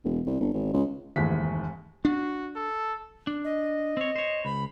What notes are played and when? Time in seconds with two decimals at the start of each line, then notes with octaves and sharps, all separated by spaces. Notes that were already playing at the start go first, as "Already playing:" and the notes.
0.05 E1
0.27 C2
0.41 G1
0.54 G#1
0.74 C#2
1.16 F1 D#2 G#2 E3 B6
2.05 D4 F#4
2.55 A4
3.27 D4
3.45 D#5
3.97 C4 C#5
4.16 C5 C#5
4.45 C#2 B5